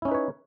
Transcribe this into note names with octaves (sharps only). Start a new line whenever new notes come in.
C#4 D#4 E4 B4 C#5